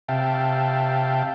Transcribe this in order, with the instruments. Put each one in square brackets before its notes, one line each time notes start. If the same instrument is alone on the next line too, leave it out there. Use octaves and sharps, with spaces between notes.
[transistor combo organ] C3 E5 F5 G5 A5